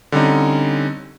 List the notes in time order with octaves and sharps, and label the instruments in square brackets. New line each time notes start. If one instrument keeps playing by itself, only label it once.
[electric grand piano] D3 G3 C4 C#4 D#4